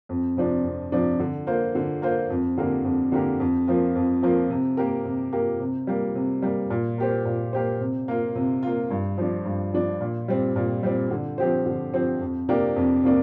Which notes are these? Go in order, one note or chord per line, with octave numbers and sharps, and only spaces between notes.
F2
C3 F3 D4
F2
C3 F3 D4
D3
A#3 F4 C5
D3
A#3 F4 C5
F2
D3 A#3 G4 A#4
F2
D3 A#3 G4 A#4
F2
F3 A#3 F4
F2
F3 A#3 F4
C3
A#3 G4 A#4
C3
A#3 G4 A#4
C3
G3 A#3
C3
G3 A#3
A#2
A#3 G4 C5
A#2
A#3 G4 C5
C3
A#3 F4
C3
A#3 F4
G2
F3 D4
G2
F3 D4
A#2
G3 C4
A#2
G3 C4
D3
F3 C4 G4 C5
D3
F3 C4 G4 C5
F2
C3 A#3 D4 G4
F2
C3 A#3 D4